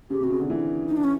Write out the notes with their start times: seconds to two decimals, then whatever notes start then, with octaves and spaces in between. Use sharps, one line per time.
0.10 C#3 G4
0.20 C3
0.24 F#4
0.30 C#3
0.40 D3
0.50 E3
0.88 D#4
0.97 D4
1.04 C#4